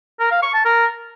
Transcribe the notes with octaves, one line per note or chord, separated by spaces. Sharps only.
A#4
F5
C#6
A5
A#4